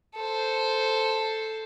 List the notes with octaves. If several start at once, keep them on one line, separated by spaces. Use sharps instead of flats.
A4 C5